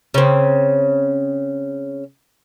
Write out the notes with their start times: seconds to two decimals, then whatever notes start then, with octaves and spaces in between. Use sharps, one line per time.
0.14 C#3 C4